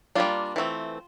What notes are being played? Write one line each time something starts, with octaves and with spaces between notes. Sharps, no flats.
G3 A#3 D4 F4
E3 A3 C4